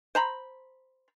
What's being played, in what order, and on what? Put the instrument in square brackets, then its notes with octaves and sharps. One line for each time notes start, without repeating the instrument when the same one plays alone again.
[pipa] C5 A#5 B5